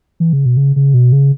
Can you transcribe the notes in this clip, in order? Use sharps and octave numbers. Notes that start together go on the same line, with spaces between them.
E3
C#3
B2
C#3
C#3
B2
C#3